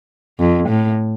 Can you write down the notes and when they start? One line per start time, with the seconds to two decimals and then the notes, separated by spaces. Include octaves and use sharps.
0.39 F2
0.69 A2